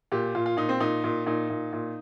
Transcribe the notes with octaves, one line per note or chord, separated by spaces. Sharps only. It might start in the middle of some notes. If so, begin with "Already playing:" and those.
A#2 G4
A#2 F4
F4
A#2 D#4
C4
A#2 D#4
A#2
A#2 D#4
A#2
A#2